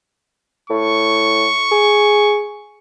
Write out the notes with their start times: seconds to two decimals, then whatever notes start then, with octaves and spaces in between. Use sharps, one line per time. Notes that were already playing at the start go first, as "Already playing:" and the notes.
0.70 A2 C#6
1.71 G#4